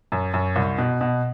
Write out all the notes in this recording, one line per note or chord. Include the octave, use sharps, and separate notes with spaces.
F#2
F#2
C2
B2
B2